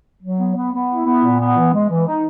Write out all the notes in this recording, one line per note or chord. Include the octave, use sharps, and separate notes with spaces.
F#3
B3
B3
B3
E4
B3
A#2
B3
E3
G#3
E3
D#4